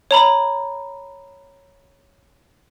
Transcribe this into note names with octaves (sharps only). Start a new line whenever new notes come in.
C#5 A#5 B5